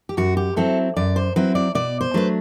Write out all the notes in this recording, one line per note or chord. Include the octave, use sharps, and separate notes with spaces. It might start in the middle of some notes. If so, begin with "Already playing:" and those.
G4
F#2 F#4
G4
F#3 C4 E4 A4
F#2 D5
C5
F#3 C4 E4 B4
D5
B2 D5
C5
F#3 A3 D4 B4